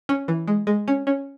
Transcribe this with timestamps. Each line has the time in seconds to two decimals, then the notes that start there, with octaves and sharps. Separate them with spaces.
0.09 C#4
0.28 E3
0.48 G#3
0.67 G#3
0.88 C#4
1.07 C#4